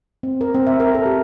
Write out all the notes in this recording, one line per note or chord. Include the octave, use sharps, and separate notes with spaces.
C4
A#4
C4
E5
A#4
A4
G4